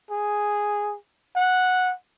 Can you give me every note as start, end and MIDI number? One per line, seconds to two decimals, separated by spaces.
0.11 0.95 68
1.36 1.93 78